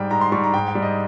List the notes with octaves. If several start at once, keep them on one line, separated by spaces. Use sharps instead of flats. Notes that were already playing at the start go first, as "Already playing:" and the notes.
Already playing: G#2 G3 G5
G#2 A#5
C6
G3 C#6
A#5
G#2 G5
G5
G3
D#5